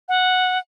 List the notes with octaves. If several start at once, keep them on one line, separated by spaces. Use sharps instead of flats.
F#5